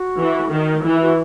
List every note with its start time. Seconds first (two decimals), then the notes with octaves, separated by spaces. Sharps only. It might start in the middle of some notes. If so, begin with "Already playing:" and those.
Already playing: F#4
0.19 E3
0.52 D#3
0.85 E3 E4
1.01 F#4